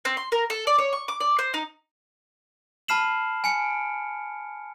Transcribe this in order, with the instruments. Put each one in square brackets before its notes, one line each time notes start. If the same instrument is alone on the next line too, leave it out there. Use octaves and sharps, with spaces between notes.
[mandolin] C4
C6
A#4
A4
D5
C#5
C#6
D6
D5
C5
D#4
[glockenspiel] A5 B5 F6 C7 E7 F#7
G#5 C#7 D7